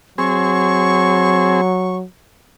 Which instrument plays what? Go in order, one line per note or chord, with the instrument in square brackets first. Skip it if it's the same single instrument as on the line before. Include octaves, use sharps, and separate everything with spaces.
[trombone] F#3 [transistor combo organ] C4 G#4 [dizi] C#6